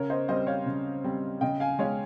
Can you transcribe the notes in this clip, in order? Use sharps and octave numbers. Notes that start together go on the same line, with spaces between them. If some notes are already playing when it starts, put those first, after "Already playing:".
Already playing: C#3 A#4 C#5
C5 D#5
G3 C4 C5 D#5
C#5 F5
C#3
G3 C4
C#3 D#5 G5
F5 G#5
G#3 C#4 C#5 F5